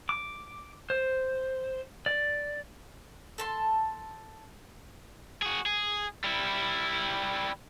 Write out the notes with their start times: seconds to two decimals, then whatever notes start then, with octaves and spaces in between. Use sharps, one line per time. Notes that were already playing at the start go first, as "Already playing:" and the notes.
0.09 D6
0.90 C5
2.06 D5
3.38 A4 A5 C6
5.42 F#4 G#4
5.66 G#4
6.24 G3 E4